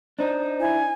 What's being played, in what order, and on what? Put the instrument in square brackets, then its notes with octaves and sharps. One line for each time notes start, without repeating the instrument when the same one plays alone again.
[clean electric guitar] D4 D#4 [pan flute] C5
[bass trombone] E4 [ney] G#5